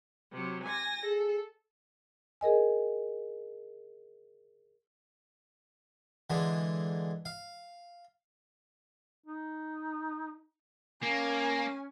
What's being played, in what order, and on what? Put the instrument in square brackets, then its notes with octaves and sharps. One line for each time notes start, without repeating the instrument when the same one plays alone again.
[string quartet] C3 F#3
G#5 A#6
[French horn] G#4 [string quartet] A4
[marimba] G#4 A#4 D#5 G#5
[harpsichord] D3 E3 G#3
F5
[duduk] D#4
[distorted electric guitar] A#3 [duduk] C#4 [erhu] G#5